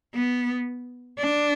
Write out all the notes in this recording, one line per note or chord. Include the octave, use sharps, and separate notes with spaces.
B3
D4